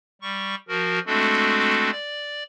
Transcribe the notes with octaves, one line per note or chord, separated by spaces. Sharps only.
G3 C#6
F3 F#4 A#4
G#3 A3 C4 D4 F#4 A4
D5